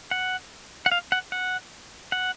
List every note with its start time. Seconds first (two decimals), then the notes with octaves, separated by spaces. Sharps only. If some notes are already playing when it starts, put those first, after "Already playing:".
0.11 F#5
0.86 F#5
0.92 F5
1.12 F#5
1.32 F#5
2.12 F#5